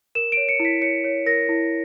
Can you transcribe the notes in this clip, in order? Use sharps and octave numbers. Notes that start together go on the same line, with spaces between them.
A#4 E7
C#5 D7
C#7
E4
B6
C#5 C#7
C#5
A#4 A#6
E4